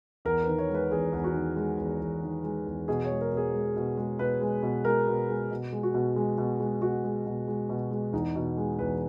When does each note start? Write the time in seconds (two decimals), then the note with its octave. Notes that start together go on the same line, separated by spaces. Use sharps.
0.25 E2 A#4
0.42 B4
0.47 D#3
0.58 C#5
0.69 G#3
0.74 B4
0.91 E2 G#4
1.13 E2
1.24 F#4
1.34 D#3
1.56 G#3
1.78 E2
2.01 E2
2.23 D#3
2.44 G#3
2.66 E2
2.88 B2 G#4
3.04 C#5
3.10 G#3
3.21 A#4
3.32 B2
3.37 G#4
3.54 G#3
3.76 B2
3.97 G#3
4.19 B2 B4
4.41 G#3
4.63 B2
4.85 G#3 A#4
5.07 B2
5.29 G#3
5.50 B2
5.72 G#3
5.83 F#4
5.94 B2
6.16 G#3
6.38 B2
6.60 G#3
6.81 B2 F#4
7.04 G#3
7.26 B2
7.48 G#3
7.69 B2
7.91 G#3
8.13 E2 D#4
8.35 B2
8.57 G#3
8.79 E2 B4